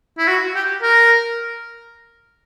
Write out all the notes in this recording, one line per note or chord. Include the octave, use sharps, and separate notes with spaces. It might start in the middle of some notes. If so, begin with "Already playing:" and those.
E4
F#4
G4
A#4